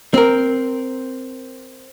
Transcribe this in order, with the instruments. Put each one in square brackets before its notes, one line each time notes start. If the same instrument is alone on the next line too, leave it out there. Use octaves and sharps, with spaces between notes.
[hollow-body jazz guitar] C4 A#4